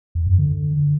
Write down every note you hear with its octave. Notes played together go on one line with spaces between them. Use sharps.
E2
F#2
D3